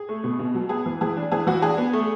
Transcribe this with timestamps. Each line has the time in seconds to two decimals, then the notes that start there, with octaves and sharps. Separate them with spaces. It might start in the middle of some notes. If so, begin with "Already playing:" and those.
Already playing: G#4
0.09 A3
0.24 B2
0.39 B2
0.55 F#3
0.69 B3 G#4
0.86 E3
1.01 E3 G#4
1.17 D4
1.32 E3 G#4
1.47 E3 F#4
1.62 D4 G#4
1.77 B3
1.93 A3